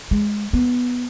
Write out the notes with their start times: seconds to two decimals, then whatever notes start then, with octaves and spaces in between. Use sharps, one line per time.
0.11 G#3
0.53 B3